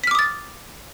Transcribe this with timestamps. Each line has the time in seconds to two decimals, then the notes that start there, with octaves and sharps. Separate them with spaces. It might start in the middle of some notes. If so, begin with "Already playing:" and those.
0.04 B6
0.07 F6
0.11 D6
0.15 D#6
0.19 A6